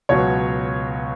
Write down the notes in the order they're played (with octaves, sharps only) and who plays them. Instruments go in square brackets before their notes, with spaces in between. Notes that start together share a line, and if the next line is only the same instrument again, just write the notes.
[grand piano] C#2 B2 F#3 C#5